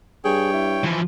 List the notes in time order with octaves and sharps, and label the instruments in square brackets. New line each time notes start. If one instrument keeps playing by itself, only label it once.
[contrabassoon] G2 [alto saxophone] G#4 [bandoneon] C#5 G5
[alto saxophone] E4
[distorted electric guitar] E3 F3